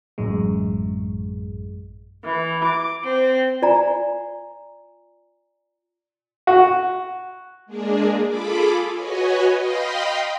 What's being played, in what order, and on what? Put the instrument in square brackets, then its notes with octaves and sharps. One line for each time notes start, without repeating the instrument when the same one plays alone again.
[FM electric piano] A1 F#2 A2 G#3
[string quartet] E3
D6
C4
[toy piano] F4 D5 G#5 A#5
[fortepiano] F#4
[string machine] G#3 A#3 D4 G#4
F4 G#4 A4 B5 D6
F#4 B4 C#5 D#5 G#5
D#5 F5 G5 B5 C6